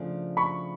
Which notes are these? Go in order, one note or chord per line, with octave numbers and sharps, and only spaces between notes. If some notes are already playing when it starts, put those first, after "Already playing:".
Already playing: C#3 F3 A3 D4
B5 C#6